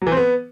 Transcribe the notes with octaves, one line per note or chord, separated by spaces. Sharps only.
F#3
E3
C4
B3